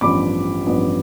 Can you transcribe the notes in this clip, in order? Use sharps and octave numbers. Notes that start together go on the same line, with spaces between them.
A1 G2 F3 B3 B5 D6
A1 G2 F3 B3